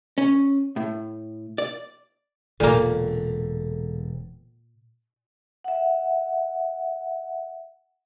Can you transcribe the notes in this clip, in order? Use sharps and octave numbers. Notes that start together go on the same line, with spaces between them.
C#4
A2
D5
E1 A#2 D3 A#3 A4
E5 F#5